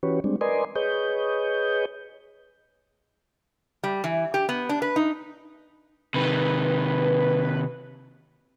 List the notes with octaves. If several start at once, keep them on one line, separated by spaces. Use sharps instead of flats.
E3 C#4 F#4 G4 B4 C#5
G3 G#3 C4 D4
A#4 B4 D5 D#5 G#5 C6
G#4 B4 C#5 D#5 G6
G3
E3
G4
B3
D4
B4
D#4
C3 D#3 B4